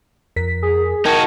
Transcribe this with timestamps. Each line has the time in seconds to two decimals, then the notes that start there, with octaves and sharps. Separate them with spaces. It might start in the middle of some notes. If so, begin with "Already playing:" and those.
0.36 F2 A#4 B6
0.62 G#4
1.05 D#4 F#4 A#4 G5 A5 G#6